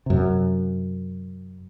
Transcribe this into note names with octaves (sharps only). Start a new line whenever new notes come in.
F#2 C3